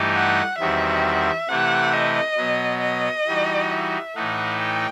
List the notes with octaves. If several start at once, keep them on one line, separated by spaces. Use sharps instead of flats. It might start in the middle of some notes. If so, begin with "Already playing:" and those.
Already playing: G2 E3 A3 D#4 G4
F#5
E2 D#3 G3 C4 F#4 E5
C3 E3 A3 E4 G4 F#5
D#5
B2 F#3 B3
D#5
E3 G3 D#4 F#4
E5
A2 E3 A3 D#4 F#5
G5